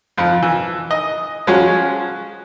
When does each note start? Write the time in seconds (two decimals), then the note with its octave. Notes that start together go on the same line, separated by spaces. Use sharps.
0.18 F2 F3
0.43 E3
0.91 D#5
1.47 F3 F#3 G#3 C#4 F#4 C#5